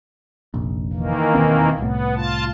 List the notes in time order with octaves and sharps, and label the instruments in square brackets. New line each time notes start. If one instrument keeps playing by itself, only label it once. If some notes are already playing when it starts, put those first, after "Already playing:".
[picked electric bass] F1 A#1
[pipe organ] D#3 E3 A#3
[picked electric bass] E1 D#2 C4
[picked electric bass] C2 A2 [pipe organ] B3
[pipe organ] F4 A5